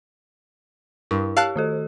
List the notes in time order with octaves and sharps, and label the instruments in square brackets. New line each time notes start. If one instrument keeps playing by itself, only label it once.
[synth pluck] G2 [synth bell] E4
[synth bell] G4 [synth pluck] F5 A5 F#6
[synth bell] D#3 F#4 A4